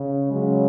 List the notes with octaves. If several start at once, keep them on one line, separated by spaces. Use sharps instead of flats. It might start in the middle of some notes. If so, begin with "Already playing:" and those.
Already playing: C#3
C#3 F#3 G#3